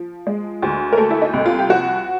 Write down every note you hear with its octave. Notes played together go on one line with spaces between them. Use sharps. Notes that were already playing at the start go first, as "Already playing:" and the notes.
Already playing: F3
G#3
D2
A#4
A3 A4
E4
D#4
C2
F4
G4
F3 F#4